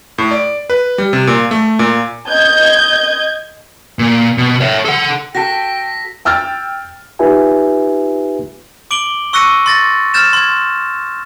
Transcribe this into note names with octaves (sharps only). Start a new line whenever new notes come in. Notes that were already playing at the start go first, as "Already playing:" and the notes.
A2
D5
B4
G3
C3
A#2
A3
A#2
D#5 G6 G#6
A#2
B2
C#5 E5
A4 F#5
F#4 A4 G5 A#6 B6
G5 E6 F6 A6
D#4 F4 G4 B4 E5 G#5
D6 D7 F#7 G7
C#6 E6 F#6 A#6 C#7 D#7
C6 A6 A#6
F6 G6 A6 E7
C6 G#6